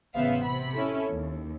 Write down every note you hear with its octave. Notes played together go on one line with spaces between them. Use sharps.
A1 C#3 B3 C5 E5 F5
C3 B5
C#4 E4 A4
D#2